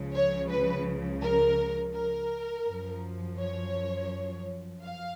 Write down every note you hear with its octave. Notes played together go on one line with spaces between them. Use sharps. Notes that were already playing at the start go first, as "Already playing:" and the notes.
Already playing: C#2 C#3 F3
C#5
B4
A#4
A#4
F#2 F3
C#5
F5